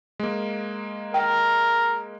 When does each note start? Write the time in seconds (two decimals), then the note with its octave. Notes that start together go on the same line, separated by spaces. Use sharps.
0.19 G#3 A#3
1.14 A#4 G5